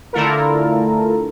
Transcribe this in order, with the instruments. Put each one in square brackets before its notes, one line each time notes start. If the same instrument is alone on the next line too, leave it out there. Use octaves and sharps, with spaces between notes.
[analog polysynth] D3 A3 E4 F4 A4 A#4